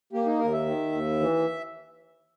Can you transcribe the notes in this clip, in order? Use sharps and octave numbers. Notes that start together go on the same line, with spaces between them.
A#3 G4
D#4
D#2 A#4
E5
D#3
D#2
E3